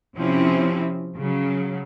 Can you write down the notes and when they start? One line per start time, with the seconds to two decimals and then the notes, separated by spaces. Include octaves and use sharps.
0.17 C3 F3 C4 C#4 E4
1.16 C#3 F#3